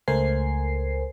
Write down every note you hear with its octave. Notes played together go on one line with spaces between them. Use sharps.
C#2 A3 A#4 C5 G#5 C7